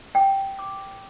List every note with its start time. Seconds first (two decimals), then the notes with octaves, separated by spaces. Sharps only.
0.15 G5
0.59 D6